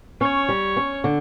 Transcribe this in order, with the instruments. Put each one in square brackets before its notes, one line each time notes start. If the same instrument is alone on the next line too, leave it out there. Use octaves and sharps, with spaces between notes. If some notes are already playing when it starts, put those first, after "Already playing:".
[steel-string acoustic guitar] C#4 [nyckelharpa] C#5
[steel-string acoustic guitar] G3
C#4
D3